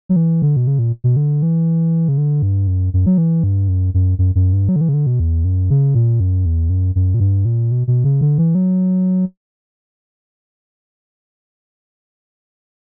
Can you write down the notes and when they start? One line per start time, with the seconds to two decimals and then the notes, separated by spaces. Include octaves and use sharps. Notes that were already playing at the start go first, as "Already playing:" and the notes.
0.09 F#3
0.16 E3
0.42 D3
0.56 B2
0.67 C#3
0.79 A#2
1.04 B2
1.16 D3
1.42 E3
2.08 C#3
2.18 D3
2.42 G2
2.67 F#2
2.94 F#2
3.06 F#3
3.18 E3
3.44 G2
3.68 F#2
3.94 F#2
4.19 F#2
4.35 F#2
4.53 G2
4.69 F#3
4.76 D3
4.81 E3
4.89 C#3
4.94 D3
5.07 B2
5.20 E2
5.45 F#2
5.70 C#3
5.95 A#2
6.20 F#2
6.46 E2
6.70 F#2
6.95 F#2
7.14 A#2
7.20 G2
7.45 A#2
7.71 B2
7.87 B2
8.04 C#3
8.21 D3
8.38 E3
8.55 F#3